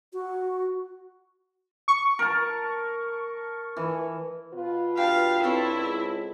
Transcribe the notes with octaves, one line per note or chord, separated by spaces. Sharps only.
F#4
C#6
A#4 A5
E3
B2 F4 B4
G2 G4 F5 A5
C4 E4 A4 C#5
C#2